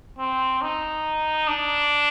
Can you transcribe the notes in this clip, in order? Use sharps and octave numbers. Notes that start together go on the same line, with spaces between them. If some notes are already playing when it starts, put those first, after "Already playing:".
C4
D#4
D4